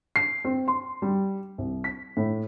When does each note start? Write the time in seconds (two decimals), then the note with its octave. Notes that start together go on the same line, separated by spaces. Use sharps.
0.16 C7
0.45 C4
0.68 C6
1.02 G3
1.58 C2
1.84 B6
2.17 A2